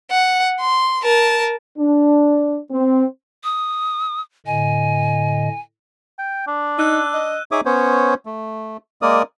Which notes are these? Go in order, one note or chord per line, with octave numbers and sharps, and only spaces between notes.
F#5
C6
A#4 A5
D4
C4
D#6
A2 D3 D#5 G#5
G5
D4
D#4 E6 F#6 D#7
D#5
D#4 G#4 C#5 E5 D6 D#6
B3 C#4 C5 C#5
A3
G#3 A#3 A#4 D5 D#6